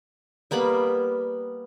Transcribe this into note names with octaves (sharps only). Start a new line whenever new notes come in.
G3 A#3 B3 B5